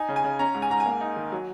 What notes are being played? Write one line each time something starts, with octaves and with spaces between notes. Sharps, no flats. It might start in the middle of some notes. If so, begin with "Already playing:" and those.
Already playing: D#4 G#5
C#3
G#5
C#3
C#4 A#5
G#2
G#5
G#2 A#5
G#5
A#3
D#4
D#3
F#3